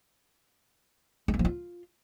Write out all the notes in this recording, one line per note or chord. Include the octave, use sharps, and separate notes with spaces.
G#3
A#3
F3
F4